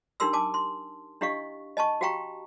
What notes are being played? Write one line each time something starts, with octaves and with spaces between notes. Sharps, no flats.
D4 D#4 G4 A#4 C6 E6
G#5 A5 D6
C6
D4 E4 G4 D#5 F5 C#6
D#5 G#5 A5 C#6
F#4 G4 F5 G5 A#5 C#6